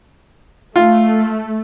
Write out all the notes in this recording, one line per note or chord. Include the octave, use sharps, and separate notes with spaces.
A3 F4